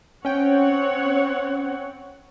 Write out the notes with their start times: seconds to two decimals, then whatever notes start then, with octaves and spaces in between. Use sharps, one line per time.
0.25 C4 C#4 C#5 F#5 G5